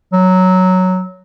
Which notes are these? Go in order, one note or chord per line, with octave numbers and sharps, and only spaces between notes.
F#3